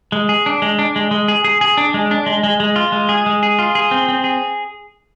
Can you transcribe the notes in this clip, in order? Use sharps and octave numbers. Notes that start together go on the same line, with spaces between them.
G#3
G#4
D4
G#3
D4
G#3
G#3
G#4
G#4
G#4
D4
G#3
D4
G#3
G#3
G#3
F4
G#3
G#4
G#3
G#4
F4
G#4
C4
C4
G#4